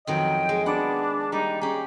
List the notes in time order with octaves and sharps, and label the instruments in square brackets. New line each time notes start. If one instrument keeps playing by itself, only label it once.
[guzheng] F2 D#3 F#3 [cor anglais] D#5 [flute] G5
[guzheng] G#3
[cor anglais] B3 [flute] D4 [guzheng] F#5
[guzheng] G3 A#3 [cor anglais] D#4
[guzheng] C#4 G4 [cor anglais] G#4